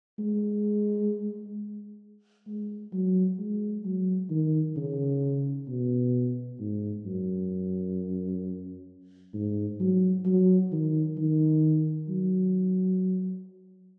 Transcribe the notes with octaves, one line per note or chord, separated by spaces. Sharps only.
G#3
G#3
F#3
G#3
F#3
D#3
C#3
B2
G#2
F#2
G#2
F#3
F#3
D#3
D#3
F#3